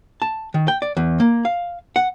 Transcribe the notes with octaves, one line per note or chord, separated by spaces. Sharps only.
A5
D#3
G5
D5
E2
A#3
F5
F#5